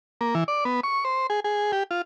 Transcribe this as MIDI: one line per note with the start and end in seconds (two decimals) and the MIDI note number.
0.21 0.35 58
0.35 0.44 52
0.48 0.64 74
0.65 0.80 59
0.84 1.04 85
1.05 1.27 72
1.30 1.40 68
1.44 1.72 68
1.72 1.83 67
1.91 2.02 65